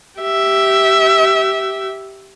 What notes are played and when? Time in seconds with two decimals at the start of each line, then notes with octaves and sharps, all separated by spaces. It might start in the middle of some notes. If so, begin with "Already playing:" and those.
0.20 G4 E5